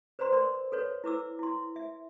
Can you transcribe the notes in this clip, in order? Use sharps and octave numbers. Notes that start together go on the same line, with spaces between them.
B4 C5 D5 A#5 C6
A#4 D5 C6
A4 B4 C#5
E4 B4 D6 E6
E4 C6
E5